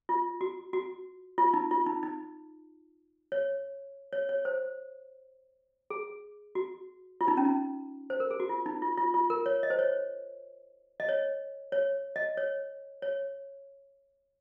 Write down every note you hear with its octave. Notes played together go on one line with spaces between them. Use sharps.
F4
F#4
F#4
F4
D#4
F4
D#4
D#4
C#5
C#5
C#5
C5
G#4
F#4
F4
D#4
C#4
D#4
C5
A#4
G#4
F#4
F4
D#4
F4
F4
F4
A#4
C#5
D#5
C5
C#5
D#5
C#5
C#5
D#5
C#5
C#5